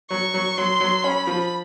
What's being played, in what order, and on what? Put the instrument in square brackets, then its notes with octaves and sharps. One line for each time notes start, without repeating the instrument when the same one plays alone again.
[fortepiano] F#3 [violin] C#6
[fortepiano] F#3
[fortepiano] F#3 [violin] C6
[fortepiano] F#3
[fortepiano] C#4 [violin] B5
[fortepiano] F3